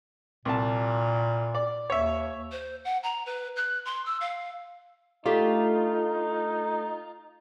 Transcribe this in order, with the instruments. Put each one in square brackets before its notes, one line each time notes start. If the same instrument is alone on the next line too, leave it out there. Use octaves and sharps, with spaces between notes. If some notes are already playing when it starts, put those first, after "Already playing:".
[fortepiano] C2 A5 [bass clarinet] A#2
[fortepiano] D5
[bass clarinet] D#2 [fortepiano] C#5 E5
[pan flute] C5
F#5
A#5
B4
F#6
C6
E6
F5
[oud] A3 D4 G4 [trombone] D#4 [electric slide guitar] F4